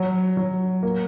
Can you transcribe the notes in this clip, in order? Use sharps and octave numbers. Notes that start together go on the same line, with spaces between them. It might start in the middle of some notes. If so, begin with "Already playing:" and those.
Already playing: F#3
F#3
A#3